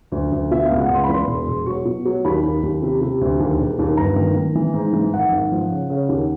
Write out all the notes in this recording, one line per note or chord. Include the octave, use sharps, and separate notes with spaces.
D2
D2
B2 E5
C#2 F5
F#5
C#2 C6
E2 B5
C6
E1
E1
F#3 C#6
B2
F#3
D#2 B5
D#2
D#2
C3
C3
D2
D#2
E1
D#2
G1 A#5
D#3
D#3
E3
G#2
E3
G#1 F#5
G#1
F3
C#3
C#3
D#2